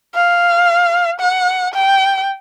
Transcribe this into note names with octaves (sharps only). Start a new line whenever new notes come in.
F5
F#5
G5